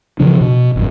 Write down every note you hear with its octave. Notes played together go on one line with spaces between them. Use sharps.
C#3 E3 F3 D4
B2
G#1 F#2